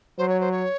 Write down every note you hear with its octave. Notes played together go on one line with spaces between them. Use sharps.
F#3 C5
C#5
C5
C#5